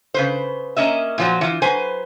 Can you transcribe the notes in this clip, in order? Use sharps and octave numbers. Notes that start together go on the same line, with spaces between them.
C#3 B4 C5
A#3 C#4 D#5 E5
A#2 F3 F#3
E3 F4
F#3 B4 C5 G#5